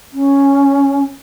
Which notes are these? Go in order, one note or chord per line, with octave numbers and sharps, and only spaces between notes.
C#4